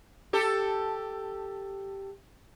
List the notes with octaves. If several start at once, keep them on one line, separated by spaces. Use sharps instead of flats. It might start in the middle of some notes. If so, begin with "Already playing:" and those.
G4 A4